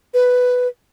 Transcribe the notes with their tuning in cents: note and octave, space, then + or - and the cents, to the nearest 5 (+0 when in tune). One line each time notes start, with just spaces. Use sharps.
B4 +5